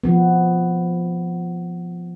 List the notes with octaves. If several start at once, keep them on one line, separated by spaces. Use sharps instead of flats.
F3 B3